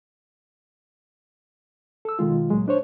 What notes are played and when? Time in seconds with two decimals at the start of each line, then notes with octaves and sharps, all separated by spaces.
2.05 A4 E6
2.19 B2 D#3 G#3 F4
2.50 C#2 A#2 F#3 G#3
2.68 D4 C5 C#5